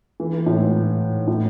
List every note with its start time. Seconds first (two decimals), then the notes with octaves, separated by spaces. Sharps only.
0.20 E3
0.33 E3
0.46 A2
0.60 G#2
1.27 A2